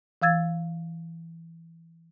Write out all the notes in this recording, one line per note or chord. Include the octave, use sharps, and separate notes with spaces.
E3 F5 E6 G#6 A6